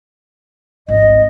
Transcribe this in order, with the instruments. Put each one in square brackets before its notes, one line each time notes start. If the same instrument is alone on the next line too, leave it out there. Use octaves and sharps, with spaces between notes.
[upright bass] G#1 C#2 [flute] D#5